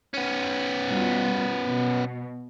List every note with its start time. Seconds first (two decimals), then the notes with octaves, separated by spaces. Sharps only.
0.14 B3 C#4
0.88 B2 G3 F4
1.65 B2